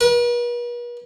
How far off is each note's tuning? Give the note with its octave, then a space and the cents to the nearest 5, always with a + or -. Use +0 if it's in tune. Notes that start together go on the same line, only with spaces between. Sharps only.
B4 -45